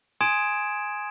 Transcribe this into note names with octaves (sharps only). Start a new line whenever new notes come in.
G#5 C6 D#6 G#6 D7 E7